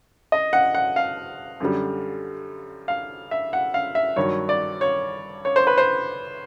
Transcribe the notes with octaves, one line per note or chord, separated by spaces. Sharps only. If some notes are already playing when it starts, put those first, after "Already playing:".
D#5
F#5
F#5
F5
F#2 D3 G3
F5
E5
F#5
F5
E5
G2 D#3 F#3 C#5
D5
C#5
C#5
C5
B4
C5